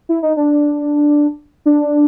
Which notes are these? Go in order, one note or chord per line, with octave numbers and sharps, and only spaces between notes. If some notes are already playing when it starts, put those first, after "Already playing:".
E4
D#4
D4
D4